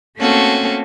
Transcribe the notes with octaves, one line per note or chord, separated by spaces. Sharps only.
A3 A#3 C4 C#4 F#4 A4